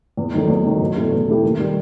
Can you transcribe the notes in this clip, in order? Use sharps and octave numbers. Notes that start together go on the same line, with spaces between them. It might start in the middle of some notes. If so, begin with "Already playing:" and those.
E2
D#3 F#3 A3 D#4
E2
D#3 F#3 A3 D#4
E2
B2 A3 E4 G4
E2
B2 A3 E4 G4
D#2
D#3 G3